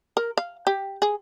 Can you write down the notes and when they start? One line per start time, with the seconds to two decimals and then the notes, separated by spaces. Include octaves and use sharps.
0.17 A#4
0.37 F5
0.67 G4
1.02 G#4